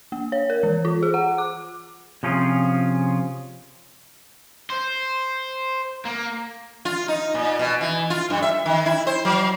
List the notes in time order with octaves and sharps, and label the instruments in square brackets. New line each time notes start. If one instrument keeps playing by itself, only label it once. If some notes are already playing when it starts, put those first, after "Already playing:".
[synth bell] A#3
C#5
A#4
E3
F4
G#4
F#5
D6
[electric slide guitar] C3 F3 C#4 F4 G#4
[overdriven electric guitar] C5
A#3
[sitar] F4
D#4
A#2
B2
E3
F4
G2
E5
D#3
E4
C5
F#3